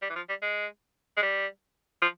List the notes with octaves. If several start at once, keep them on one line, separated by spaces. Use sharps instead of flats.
G3
E3
F3
G3
G#3
G#3
G3
F3